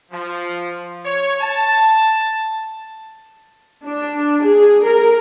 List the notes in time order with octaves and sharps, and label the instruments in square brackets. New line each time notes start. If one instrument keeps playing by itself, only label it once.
[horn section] F3
C#5
A5
[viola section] D4
G#4
A#4